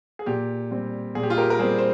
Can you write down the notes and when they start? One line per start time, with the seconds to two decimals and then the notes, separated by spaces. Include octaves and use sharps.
0.19 G#4
0.26 A#2 G4
0.71 G3 C4
1.15 A#2 G#4
1.23 G4
1.30 F4 G#4
1.38 G4 A#4
1.50 A#4
1.59 G3 G#4 C5
1.63 C4
1.78 C5